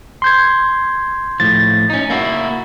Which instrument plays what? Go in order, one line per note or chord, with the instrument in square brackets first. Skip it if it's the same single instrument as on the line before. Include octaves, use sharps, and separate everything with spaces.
[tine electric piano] C6 G6 G#6
[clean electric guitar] A2 F3 [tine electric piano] A6
[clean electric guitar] C#4 D#4
A#3 E4 F#4